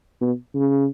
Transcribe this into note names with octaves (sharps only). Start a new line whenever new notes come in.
B2
C#3